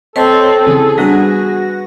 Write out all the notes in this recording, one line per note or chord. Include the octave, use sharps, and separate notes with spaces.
C4 A4 C#5 D#5 A5 C7
C#3 E3 C4 G#4
G3 B3 D4 F#4 B4 F#5 A#6